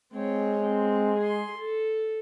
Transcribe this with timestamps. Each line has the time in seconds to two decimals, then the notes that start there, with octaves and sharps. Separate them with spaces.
0.14 G#3 C4 C#5
0.62 C4
1.17 G#4 C6
1.57 A4